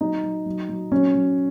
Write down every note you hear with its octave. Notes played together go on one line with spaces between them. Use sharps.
F#3 D#4
F#3
F#3
F#3
F#3 C#4
F#3